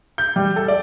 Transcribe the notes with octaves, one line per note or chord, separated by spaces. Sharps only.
G6
G3
A4
D5